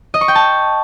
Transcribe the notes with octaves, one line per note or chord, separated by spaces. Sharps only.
D#5
C#6
G5
A5